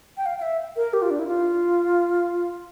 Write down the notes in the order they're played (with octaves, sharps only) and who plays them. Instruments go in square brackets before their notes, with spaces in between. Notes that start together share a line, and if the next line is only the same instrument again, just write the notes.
[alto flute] G5
F5
F5
E5
A#4
G4
F4
D4
E4
F4